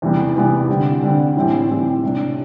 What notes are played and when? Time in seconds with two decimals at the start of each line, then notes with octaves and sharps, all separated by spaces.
0.02 E2 C3 E3 G3 B3
0.36 E2 C3 E3 G3 B3
0.69 D3 G3 C4
1.03 D3 G3 C4
1.36 A2 E3 G3 C4 G4
1.69 A2 E3 G3 C4 G4
2.03 C3 G3 D4